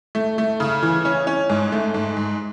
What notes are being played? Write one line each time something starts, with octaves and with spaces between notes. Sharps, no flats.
A3
A3
C#3
E3
C#4
C#4
G#2
A3
G#2
G#2